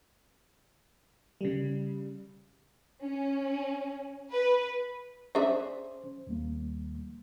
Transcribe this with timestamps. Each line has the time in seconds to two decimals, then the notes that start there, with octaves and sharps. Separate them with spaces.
1.41 C#3 G3
3.03 C#4
4.31 B4
5.35 C#4 D4 G#4 C5 E5
6.27 D#2 G3 A#3